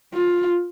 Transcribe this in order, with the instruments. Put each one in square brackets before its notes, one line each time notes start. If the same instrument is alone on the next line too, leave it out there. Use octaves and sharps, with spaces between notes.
[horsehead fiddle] F4